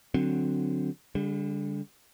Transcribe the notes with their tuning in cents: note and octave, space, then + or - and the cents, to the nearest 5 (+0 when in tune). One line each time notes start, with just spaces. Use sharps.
D3 +0 F#3 -5 C4 +0
D3 -25 G3 +30